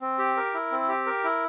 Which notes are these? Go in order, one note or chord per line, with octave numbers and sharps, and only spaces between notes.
C4
G4
A#4
E4
C4
G4
A#4
E4